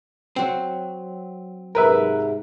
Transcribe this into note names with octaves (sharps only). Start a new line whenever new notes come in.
F#3 C4
G#2 C3 A#4 B4 E5